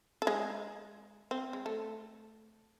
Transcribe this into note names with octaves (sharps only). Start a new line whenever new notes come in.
A4
G#3 G#4
C4
G#3
A3